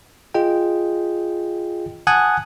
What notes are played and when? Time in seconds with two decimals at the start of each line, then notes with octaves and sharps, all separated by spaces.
0.34 F4 G#4 D#5 G5
2.07 F#5 G#5 A5 D#6 F#6 G#6